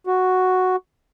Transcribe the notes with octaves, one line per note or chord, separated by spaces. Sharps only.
F#4